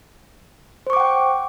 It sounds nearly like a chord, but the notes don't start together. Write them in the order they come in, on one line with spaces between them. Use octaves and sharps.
C5 C#6 D6 F#5 G5